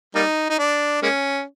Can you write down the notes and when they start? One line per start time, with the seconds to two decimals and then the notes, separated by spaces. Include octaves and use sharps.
0.15 G3 A#3 D#4
0.49 D#4
0.59 D4
1.02 G#3 A#3 C#4